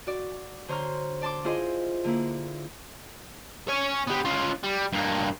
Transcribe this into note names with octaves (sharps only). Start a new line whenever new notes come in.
F#4 D5
D3 C5 C#5 A#5 C6 F6
D5 A5 C6 D6
E4 F4 G#4 C5 D#5 C6
D3 A#3 E4
C#5 G#5
B3 G4
C#4 F4
G3
G2 A#3